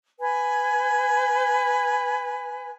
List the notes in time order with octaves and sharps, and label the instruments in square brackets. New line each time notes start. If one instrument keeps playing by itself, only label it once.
[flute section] B4 G#5